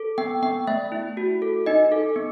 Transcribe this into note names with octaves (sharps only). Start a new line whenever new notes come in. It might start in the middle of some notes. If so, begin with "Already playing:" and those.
Already playing: A4
B3 G5
B3 G5
A3 E5
E4
F#4
A4
D#4 D#5
A4
B3